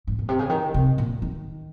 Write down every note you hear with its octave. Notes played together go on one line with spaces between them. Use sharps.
G#2
A#2
C3
C#3
D#3
C3
A#2
D#3